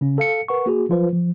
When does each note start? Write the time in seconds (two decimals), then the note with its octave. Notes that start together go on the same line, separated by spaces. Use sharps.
0.01 C#3 C#4
0.18 A4 F5 C#7
0.48 A#4 B4 F#5 C#6
0.66 A#3 F#4 G#4
0.89 F3 F#3 F4 B4 C5
1.13 F3